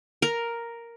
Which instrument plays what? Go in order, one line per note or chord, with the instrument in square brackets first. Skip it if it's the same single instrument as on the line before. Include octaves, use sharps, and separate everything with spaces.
[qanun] A#4